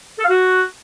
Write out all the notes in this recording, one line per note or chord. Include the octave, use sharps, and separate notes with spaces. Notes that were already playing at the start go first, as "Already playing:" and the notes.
A4
F5
F#4